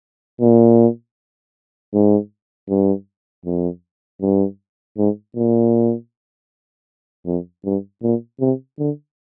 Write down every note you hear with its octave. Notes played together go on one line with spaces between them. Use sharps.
A#2
G#2
G2
F2
G2
G#2
A#2
F2
G2
A#2
C3
D3